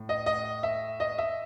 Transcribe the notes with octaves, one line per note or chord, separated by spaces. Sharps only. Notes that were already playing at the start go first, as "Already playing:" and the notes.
Already playing: A2
D#5
D#5
E5
D#5
E5